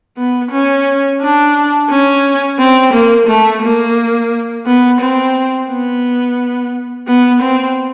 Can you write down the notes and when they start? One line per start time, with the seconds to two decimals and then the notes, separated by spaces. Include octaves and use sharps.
0.17 B3
0.51 C#4
1.21 D4
1.90 C#4
2.59 C4
2.93 A#3
3.28 A3
3.62 A#3
4.66 B3
5.01 C4
5.70 B3
7.07 B3
7.42 C4